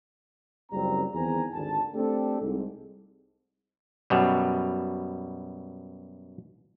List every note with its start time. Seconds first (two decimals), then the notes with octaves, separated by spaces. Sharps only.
0.72 F#1 C#2 G3 A#3 C4 A#5
1.14 E2 D#3 C4 G#5 A#5
1.54 G#1 D#2 D3 A5
1.94 A3 C4 D4 G4 A4
2.41 C2 G#2
4.10 F#2 B2 G3